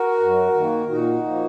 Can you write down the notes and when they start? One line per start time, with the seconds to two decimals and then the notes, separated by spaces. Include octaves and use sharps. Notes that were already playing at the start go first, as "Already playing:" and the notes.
Already playing: F#4 A#4
0.20 F#2
0.54 D#3 A#3
0.89 A#2 D#4 F#4
1.24 F3 A#3